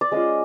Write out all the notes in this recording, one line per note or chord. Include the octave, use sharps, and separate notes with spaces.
D5
G#3 C#4 F4 D#5